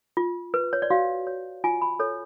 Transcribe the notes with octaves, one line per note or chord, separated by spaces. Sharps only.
F4
B4
C#5
D5
F#4 F5
C#5
F4 G#5
B5
A4 C#5